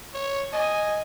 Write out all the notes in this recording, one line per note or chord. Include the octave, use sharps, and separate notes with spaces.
C#5
D#5 G#5